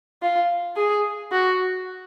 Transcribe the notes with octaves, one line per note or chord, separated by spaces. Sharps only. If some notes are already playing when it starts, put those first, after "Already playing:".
F4
G#4
F#4